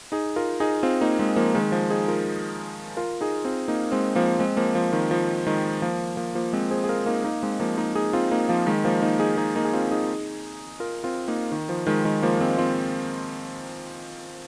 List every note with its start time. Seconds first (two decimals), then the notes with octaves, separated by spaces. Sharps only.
0.12 D#4 G#4
0.36 F4 A#4
0.60 D#4 G#4
0.83 C4 F4
1.01 A#3 D#4
1.19 G#3 C4
1.36 F3 A#3
1.54 D#3 G#3
1.72 F3
1.90 D#4 G#4
2.08 F4 A#4
2.97 F4 A#4
3.21 D#4 G#4
3.45 C4 F4
3.68 A#3 D#4
3.92 G#3 C4
4.15 F3 A#3
4.39 G#3 C4
4.57 F3 A#3
4.75 F3
4.93 D#3
5.11 F3
5.47 D#3 G#3
5.82 F3 A#3
6.17 F3 A#3
6.35 F3 A#3
6.53 G#3 C4
6.71 G#4 C5
6.84 G#4
6.89 F4 A#4
7.06 A#3 D#4
7.24 A#3 D#4
7.43 G#3 C4
7.60 F3 A#3
7.78 A#3 D#4
7.95 D#4 G#4
8.13 C4 F4
8.31 A#3 D#4
8.49 F3 A#3
8.66 D#3 G#3
8.85 F3 A#3
9.02 A#3 D#4
9.20 D#4 G#4
9.37 D#4 G#4
9.56 A#3 D#4
9.65 G#4
9.73 C4 F4
9.91 D#4 G#4
10.80 F4 A#4
11.04 C4 F4
11.28 A#3 D#4
11.52 D#3
11.69 F3
11.87 D#3 G#3
12.05 D#3 G#3
12.23 F3 A#3
12.41 G#3 C4
12.58 C4 F4